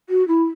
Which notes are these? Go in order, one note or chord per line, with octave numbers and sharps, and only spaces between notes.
F#4
E4